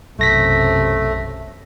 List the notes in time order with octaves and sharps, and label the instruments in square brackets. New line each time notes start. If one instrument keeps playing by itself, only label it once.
[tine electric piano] B1 A#6 B6 [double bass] F#2 C3 [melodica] A3